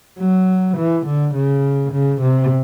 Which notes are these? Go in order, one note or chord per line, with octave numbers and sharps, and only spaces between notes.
F#3
E3
D3
C#3
C#3
C3